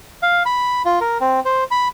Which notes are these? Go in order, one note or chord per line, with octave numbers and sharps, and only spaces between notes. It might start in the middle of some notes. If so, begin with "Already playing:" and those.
F5
B5
F4
A#4
C4
C5
B5